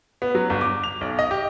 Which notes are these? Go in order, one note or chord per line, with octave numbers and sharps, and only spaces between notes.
B3
F#3
G1
D6
F7
B1
D#5
G4